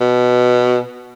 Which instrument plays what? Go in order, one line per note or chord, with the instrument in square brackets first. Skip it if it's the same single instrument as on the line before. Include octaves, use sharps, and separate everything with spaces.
[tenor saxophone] B2